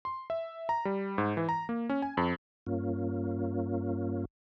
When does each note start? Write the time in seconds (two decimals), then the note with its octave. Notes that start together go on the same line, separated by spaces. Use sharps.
0.05 C6
0.30 E5
0.69 A#5
0.85 G3
1.18 G#2
1.37 E3
1.49 A#5
1.69 A#3
1.89 C#4
2.02 G#5
2.17 F2
2.67 G2 A#3 C#4 F4